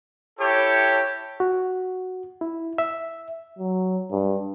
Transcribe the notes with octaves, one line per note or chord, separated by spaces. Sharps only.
E4 G4 A4 C#5
F#4
E4
E5
F#3
G2